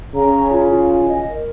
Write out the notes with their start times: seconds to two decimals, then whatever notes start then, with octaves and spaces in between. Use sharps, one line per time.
0.14 C#3 A#5
0.34 C#5
0.52 F4
0.71 F4
0.89 G#5
1.07 D#5
1.26 A#4